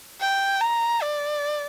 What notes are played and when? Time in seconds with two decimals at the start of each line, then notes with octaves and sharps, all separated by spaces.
0.21 G5
0.61 A#5
1.02 D5